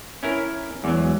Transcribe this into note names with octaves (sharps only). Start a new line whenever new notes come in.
C#4 E4 A#4
E2 F#3 G#3